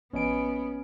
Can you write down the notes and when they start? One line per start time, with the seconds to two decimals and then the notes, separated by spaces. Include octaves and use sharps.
0.13 A#1 B3 C#4 D#5 G#5 D7